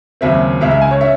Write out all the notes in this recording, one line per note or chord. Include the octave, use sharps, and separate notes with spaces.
D#2 C#3 F#3 C4 E5
C#2 C#3 G#3 E5
E5
G#5
C#5
C#4 E5